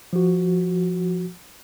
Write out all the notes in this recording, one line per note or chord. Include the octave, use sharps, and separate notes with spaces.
F3 F#4